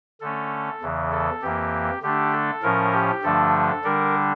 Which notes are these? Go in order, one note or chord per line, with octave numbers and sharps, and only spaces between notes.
D3 A3 C#4 A4
E2 C#3 E3
A4
F2 E3 A#3 G4
D3 A3 D4 G4
A4
A2 F3 C#4 A#4
G4
G2 D3 F3 A3 D4 A4
D3 G3 D4 A#4